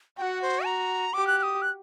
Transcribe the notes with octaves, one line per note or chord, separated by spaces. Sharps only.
F#4 F#5 G5
C5
A#5
G4 D6
F#6
F#6
D#6
F#6